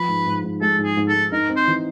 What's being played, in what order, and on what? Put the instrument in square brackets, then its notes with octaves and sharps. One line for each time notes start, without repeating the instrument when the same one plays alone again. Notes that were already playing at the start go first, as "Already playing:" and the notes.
Already playing: [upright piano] F3 [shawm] B4
[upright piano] G#2
G#2
G#2
[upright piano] G#3 [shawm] A4
[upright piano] G#2
[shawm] G#4
[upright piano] G#2
[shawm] A4
[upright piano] G#2
[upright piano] D#4 [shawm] A#4
[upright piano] C4
[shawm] C5
[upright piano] E3